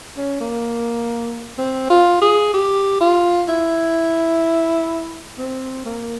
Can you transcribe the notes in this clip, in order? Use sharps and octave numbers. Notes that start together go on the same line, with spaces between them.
C#4
A#3
C4
F4
G#4
G4
F4
E4
C4
A#3